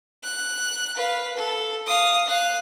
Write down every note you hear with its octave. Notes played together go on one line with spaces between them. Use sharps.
F#6
B4 F5
A4
F5 D#6
F5 F#6